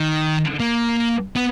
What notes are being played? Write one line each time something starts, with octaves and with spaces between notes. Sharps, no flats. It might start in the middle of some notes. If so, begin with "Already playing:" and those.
Already playing: D#3
A#3
B3